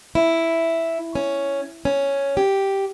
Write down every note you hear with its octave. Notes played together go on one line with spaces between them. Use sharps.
E4
C#4
C#4
G4